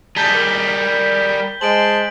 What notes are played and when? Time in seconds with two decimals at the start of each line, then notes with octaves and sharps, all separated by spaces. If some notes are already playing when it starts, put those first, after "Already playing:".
0.16 G3 G#4 A5 A#5 G6 B6 G7
0.34 A#4
1.61 G#3 C5 A5 C6 D7 F#7